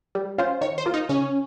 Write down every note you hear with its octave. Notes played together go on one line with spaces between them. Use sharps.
G3
C#4 F4 C5
D#3 C#5
C5
A#3 F4
D#4
C#3 C#4